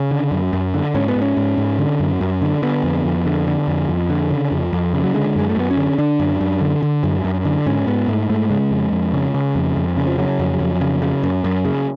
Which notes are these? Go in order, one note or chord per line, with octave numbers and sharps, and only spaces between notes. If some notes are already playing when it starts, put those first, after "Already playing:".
Already playing: C#3 C#4
D3
F#2
F#2
D3
G#2 C#4
B3
G#2
C#4
G#2
G#2
D3
F#2
F#2
D3
D3 B3
F2
F2
D3
D3
F2
F2
D3
C#3
F2
F2
C#3
F#3
D3 G#3
F#2 G#3
A3
F#2 B3
C#4
D3
D3 D4
F#2
F#2
D3
D3
F#2
F#2
D3
G#2 C#4
G#2 B3
G#2 A3
G#2 A3
C#3 G#3
F2
F2
C#3
C#3
F2
F2
C#3
F3
C#3 F#3
F2
F2
C#3
C#3
F#2
F#2
C#3